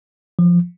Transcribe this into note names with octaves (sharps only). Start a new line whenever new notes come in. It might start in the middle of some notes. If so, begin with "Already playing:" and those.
F3